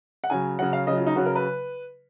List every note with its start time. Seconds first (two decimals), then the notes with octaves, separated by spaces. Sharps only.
0.24 F#5
0.30 C#3 F#3 G#5
0.59 C#3 F#3 F#5
0.73 F5
0.87 C#3 F#3 D#5
0.97 F4
1.07 D#4
1.16 C#3 F#3 F#4
1.26 A#4
1.35 B4